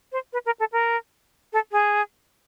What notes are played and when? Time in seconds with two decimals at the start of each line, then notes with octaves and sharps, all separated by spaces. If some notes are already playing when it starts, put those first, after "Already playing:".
0.12 C5
0.33 B4
0.46 A#4
0.60 A4
0.72 A#4
1.53 A4
1.72 G#4